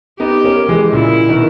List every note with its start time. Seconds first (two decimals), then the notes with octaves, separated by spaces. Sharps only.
0.20 B3 D#4 G4
0.44 A#3 C#4
0.69 E3 G#3
0.93 A#2 C#3 E4
1.29 B2 D#3